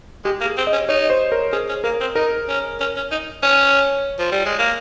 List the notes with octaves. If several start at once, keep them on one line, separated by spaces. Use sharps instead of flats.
G#3 G4
A#3
G#4
C4
D#5
C#4
D#4 C#5
C5
A#4
C#4 G#4
C#4
A#3 A#4
C4
D#4 A#4
C#4
C#4
C#4
D#4
C#4 C#5
F3
G3
G#3
A#3